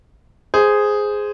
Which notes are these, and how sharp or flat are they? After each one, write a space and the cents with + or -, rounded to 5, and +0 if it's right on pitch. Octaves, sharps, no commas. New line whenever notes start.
G#4 +0 C5 -10